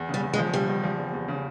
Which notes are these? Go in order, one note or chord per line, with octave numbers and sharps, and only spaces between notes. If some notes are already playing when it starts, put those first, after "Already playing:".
Already playing: E2
C#3 G3
E2
G#3
F3
C#3 G3
E2
F3
E2
E2
C#3